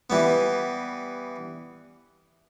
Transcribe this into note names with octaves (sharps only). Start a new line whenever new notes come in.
E3 G3 B3